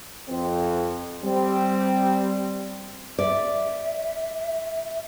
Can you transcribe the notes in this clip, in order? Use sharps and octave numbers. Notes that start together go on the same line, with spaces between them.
F2 C4
G3 C4
D5 E5